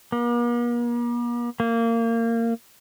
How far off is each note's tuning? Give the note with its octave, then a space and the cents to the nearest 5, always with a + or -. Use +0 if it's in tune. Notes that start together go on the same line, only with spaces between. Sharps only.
A#3 +45
A#3 -20